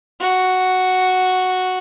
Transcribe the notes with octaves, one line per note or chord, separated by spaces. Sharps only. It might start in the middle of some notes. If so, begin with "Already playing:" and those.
F#4